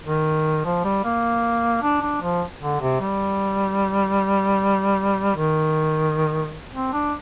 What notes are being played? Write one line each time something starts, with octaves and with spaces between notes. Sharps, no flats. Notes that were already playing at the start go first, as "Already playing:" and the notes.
D#3
F3
G3
A#3
D4
D4
F3
D3
C3
G3
D#3
C4
D4